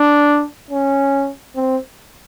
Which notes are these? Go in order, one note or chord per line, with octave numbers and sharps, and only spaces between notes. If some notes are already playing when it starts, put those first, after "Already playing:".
Already playing: D4
C#4
C4